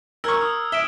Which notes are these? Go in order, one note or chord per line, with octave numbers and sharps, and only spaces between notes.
A#4 C#6 E6 F6 G#6
D#6
E5 D7 E7 G7